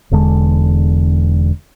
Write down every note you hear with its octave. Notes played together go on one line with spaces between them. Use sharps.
E1 E2 D3 G#3